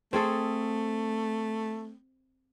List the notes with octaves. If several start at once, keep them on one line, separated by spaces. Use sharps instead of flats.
A3 C4 G#4 A4